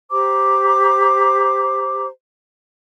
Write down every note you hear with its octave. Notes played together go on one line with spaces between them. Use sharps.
G4 C5 A#5 D6